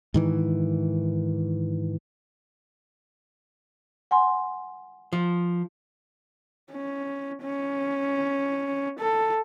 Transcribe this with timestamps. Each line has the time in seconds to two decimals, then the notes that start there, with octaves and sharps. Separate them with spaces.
0.14 G#2 D#3 E3
4.11 F#5 G#5 C6
5.13 F3
6.72 C#4
7.43 C#4
8.99 A4